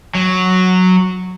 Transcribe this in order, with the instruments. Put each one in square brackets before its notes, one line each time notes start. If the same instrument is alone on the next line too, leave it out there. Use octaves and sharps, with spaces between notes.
[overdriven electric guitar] F#3